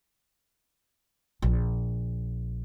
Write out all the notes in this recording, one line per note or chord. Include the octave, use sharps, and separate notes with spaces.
A#1